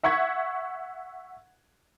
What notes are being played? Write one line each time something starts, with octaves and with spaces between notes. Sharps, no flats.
E5 F#5 C#6 G#6 B6